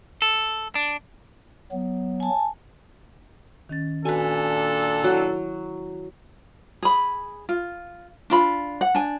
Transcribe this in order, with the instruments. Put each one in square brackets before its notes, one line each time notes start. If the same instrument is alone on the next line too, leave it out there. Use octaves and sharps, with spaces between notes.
[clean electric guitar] A4
D4
[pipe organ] F#3 B3
[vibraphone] G#5 A5
[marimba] D#3 C#4 A6
[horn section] A#2 D4 A4 [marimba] F#4 [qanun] B4 G#5
[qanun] F#3 [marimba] E4 F#5 F#6
[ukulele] G#4 B5
F4
D4 F4 B5
F#5
D4 G#5